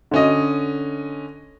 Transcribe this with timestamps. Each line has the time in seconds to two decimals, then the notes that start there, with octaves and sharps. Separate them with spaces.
0.11 D3 C#4 D#5